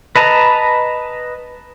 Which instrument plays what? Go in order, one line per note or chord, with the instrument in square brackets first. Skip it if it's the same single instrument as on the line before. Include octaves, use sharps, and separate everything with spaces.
[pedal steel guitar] B4 D#5 A5 A#5